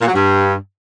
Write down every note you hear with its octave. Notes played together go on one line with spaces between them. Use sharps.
A#2
F#3
G2